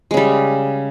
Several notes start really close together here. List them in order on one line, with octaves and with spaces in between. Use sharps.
G#3 C#3 G3